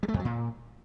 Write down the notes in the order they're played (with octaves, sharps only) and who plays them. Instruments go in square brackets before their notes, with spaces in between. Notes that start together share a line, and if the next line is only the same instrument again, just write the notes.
[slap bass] G3
A3
F2
F#3
A#2